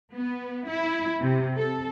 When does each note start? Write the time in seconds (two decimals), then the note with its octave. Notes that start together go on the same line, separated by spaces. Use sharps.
0.14 B3
0.69 E4
1.20 C3
1.56 A4